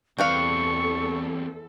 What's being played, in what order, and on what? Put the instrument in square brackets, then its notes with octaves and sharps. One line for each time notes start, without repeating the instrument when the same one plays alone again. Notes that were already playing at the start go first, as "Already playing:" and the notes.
[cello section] E2 A4 [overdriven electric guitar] E3 C4 [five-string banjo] G3 B4 F5 [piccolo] C#6